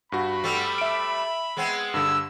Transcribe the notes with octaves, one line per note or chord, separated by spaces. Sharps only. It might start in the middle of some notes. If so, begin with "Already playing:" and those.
G2 F#4 B5
G3 A3 C4
E5 D7
G#3 B3 C4
G2 D3 E6